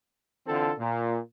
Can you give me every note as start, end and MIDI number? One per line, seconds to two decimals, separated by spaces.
0.47 0.71 50
0.47 0.71 52
0.47 0.71 60
0.47 0.71 65
0.47 0.71 69
0.79 1.18 46